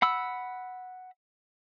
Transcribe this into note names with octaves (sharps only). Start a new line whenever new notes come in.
F#5 B5 E6